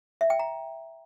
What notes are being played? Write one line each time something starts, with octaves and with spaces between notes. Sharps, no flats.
E5
G5
A#5